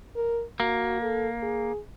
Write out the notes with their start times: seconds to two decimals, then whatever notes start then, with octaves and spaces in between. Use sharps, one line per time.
0.16 A#4
0.60 A#3 F#4
1.02 A4
1.43 G#4